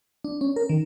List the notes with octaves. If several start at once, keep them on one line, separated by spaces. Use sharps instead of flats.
D4
C#4
A#4
D#3